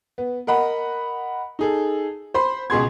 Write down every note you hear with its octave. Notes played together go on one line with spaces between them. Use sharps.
B3
A#4 D#5 F#5 B5
D#4 G#4 A4
C5 B5 C6
C#2 B2 G#4 C6 G#6